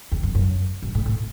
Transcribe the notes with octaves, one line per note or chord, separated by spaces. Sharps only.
E2
F#2
F#2
G2
A2
A2